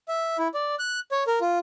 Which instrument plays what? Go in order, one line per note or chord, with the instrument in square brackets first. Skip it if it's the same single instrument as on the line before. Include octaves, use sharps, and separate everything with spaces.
[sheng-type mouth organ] E5
E4
D5
F#6
C#5
A#4
F4